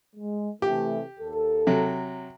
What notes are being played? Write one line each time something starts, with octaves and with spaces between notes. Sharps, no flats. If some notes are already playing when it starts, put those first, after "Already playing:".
G#3
C3 E3 A3 G4
D#2 A4
C3 F#3